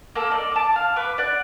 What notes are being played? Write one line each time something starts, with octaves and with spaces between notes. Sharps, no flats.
A#3 A4
A#3 D#4 D5
A5 D6
F5
B4 C#6 D6
D5 F#5